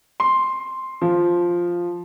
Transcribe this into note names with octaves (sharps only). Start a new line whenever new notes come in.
C6
F3